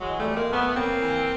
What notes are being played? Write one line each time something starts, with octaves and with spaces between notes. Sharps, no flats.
E3 F#3 G#3
G3 A3
F2
G#3 A#3
F2 A3 B3
C#3 A#3 C4
E3